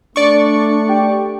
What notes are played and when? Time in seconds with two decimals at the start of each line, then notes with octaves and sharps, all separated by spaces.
0.16 A3 D4 D5 C#6
0.89 G4